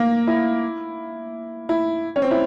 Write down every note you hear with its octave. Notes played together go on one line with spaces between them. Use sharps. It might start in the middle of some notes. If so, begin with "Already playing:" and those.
Already playing: A#3
E4
E4
C#4
C4
E4